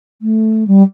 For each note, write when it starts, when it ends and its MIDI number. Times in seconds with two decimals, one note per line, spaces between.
0.22 0.64 57
0.67 0.82 55